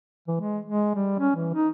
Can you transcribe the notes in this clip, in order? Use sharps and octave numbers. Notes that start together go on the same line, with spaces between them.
E3
G#3
G#3
G3
C#4
E3
D#4